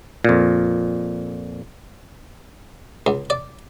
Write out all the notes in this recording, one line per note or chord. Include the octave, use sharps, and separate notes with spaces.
F2 A#2
C#2
D5